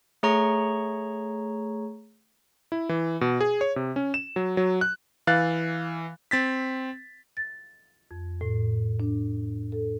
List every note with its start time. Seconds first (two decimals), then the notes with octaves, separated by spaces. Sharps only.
0.23 A3 G#4 C#5 A#5 C#6
2.72 E4
2.89 E3
3.21 B2
3.41 G#4
3.61 C#5
3.76 C3
3.96 C#4
4.14 E7
4.36 F#3
4.57 F#3
4.81 F#6
5.27 E3 F5 F#6 A6
6.31 C4 A6 B6
7.37 A6
8.11 F2
8.41 A2
9.00 D4
9.72 A4